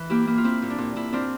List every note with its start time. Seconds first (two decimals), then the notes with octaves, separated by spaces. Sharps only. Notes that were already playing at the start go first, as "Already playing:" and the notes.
Already playing: E3
0.10 A#3 E4 G4
0.27 A#3 E4
0.38 F4
0.44 C4 E4
0.62 A#2
0.70 D4
0.78 A#2
0.96 A#2 E4
1.13 C4 D4 F4